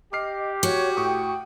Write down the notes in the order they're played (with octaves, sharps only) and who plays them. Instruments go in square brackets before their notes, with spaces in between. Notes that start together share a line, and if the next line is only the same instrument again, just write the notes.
[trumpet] G4 [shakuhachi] D#5 [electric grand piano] D6 F6 C7
[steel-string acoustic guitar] F#4 [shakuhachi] C#5
[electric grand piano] A2 C#6 D#6 [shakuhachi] G5